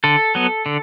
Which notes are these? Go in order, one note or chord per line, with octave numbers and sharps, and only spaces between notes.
D3 A4
F#3 B3
D3